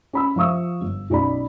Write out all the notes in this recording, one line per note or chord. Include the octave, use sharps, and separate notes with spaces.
C#4 B5 E6
F3 E5 F5 C#6 D#6 E6
G1
B1 C#4 D#4 D5 B5